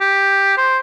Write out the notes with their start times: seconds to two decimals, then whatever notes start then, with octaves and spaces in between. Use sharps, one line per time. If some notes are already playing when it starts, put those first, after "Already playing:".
0.01 G4
0.57 C5